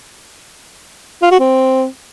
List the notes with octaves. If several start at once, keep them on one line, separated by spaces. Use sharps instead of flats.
F4
F#4
C4